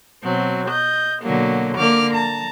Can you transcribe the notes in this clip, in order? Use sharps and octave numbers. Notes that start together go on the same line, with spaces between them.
B2 F#3 C4
D#5 G6
B2 D3 F#3 A#3
D3 A#3 D6 F6
A5 A#5